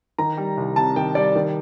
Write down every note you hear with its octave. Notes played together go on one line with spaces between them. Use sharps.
D#3 A#5
G3
C2
C3 A5
D#3 G5
G3 D5
D#3